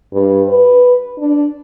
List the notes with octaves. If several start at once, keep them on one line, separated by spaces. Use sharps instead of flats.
G2
B4
D4